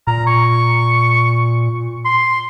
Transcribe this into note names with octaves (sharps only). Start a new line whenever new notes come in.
A#2 A#5
C#6
C6